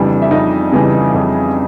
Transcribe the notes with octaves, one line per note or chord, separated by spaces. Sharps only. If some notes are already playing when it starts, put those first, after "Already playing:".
Already playing: F2 C#3 E3 G3 D4
E5
F2 D#4 D#5
C#3 E3 G3
F2